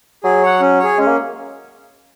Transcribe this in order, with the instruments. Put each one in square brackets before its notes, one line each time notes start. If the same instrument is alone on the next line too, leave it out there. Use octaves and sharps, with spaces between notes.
[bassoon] F#3 [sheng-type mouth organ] G#4
[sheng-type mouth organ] C#5 F#5
C#4
G#4 C#5
[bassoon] G#3 [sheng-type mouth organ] C#4
[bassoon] A#3